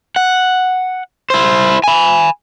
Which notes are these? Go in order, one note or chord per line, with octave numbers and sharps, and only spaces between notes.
F#5
E4 C5
G#5 B5